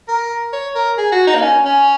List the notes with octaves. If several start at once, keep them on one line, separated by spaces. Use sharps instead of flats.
A#4
C#5
A#4
G#4
F#4
D#4
A#3
C#4
C#4